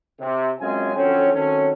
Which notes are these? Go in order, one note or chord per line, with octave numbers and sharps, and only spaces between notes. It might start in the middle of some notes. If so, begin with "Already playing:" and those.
C3
F#2 G#3 C4 C#4 F4 G#5
F2 D3 F#3 C4 C#4
D#3 F#3 A3 C4 C#4